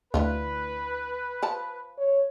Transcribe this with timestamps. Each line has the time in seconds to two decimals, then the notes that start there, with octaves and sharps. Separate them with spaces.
0.14 D2 D3 E3 F4 B4
1.43 F3 A5
1.98 C#5